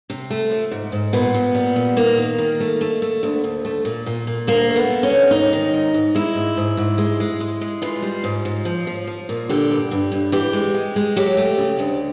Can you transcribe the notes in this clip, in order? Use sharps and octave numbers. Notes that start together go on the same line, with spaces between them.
C3
A3
F3
G#2
G#2
A#2 B3
A#2
G3
A#2
D#3 A#3
D#3
D#3
A3
A3
A3
D2
D2
A3
A#2
A#2
A#2
D2 A#3
A3
B3
A3
C#4
D2
G#2 D#4
D#3
G#2
G#2
G#3 E4
G#2
G#2
G#2
G#3
G#3
G#3
G#3
E3 F4
G3
G#2
G#2
F3
F3
F3
A#2
D3 G4
G2
G2
G2
E3 G4
G#3
G#3
G#3
F#3 G4
A3
C#3
D2